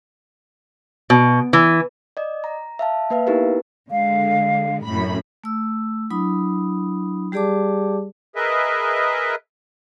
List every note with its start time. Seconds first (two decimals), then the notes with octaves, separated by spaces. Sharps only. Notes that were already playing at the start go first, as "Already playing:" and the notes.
1.10 B2
1.53 E3
2.17 D5 D#5
2.44 A#5
2.79 E5 F5 A5
3.10 A#3 B4 E5 F5
3.26 B3 D#4 E4 G4 A#4 B4
3.91 D3 G#3 F5
4.85 F#2 A2 B5
5.44 A3 E6
6.10 F#3 D4 E4 B5 D#6
7.32 G3 G4 G#4 D5 A5 D6
8.36 G#4 A#4 B4 D#5 E5